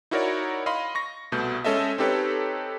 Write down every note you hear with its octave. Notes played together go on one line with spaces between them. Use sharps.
D#4 E4 F#4 A#4 C#5 D5
D#5 F5 B5 C6
C#6 A#6
C2 B2 A3 G6
G#3 C#4 A4 D#5 E5
C4 D#4 G4 A4 B4 C#5